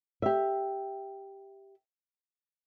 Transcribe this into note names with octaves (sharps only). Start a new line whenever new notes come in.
G4 E5